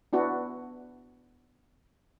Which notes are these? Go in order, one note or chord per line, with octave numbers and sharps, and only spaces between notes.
B3 D4 E4 F#4